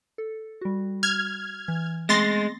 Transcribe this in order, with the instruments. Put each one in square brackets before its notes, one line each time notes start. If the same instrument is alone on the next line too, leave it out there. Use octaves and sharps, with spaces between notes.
[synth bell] A4
G3 F#4
[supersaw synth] F6 G#6
[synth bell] E3
[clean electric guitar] G#3 [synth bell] A3 B3 C4 [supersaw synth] C6 A6 A#6